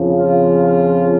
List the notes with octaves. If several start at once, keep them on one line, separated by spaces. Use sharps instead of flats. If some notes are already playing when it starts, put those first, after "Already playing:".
Already playing: F2 C#3 F3
F4
F4